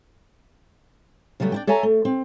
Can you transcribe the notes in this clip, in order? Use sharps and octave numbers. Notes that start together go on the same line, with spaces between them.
C#3 F#3 G3 A3 B3
D4 E4 G5
A4 C#5 E5 G#5 A#5
A3
C4